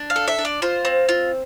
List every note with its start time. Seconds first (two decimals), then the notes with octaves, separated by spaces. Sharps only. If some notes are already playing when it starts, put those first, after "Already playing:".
Already playing: D4
0.10 F5
0.16 A4
0.28 E5
0.38 D4
0.45 D5
0.62 F4 C5
0.85 C4
1.09 F4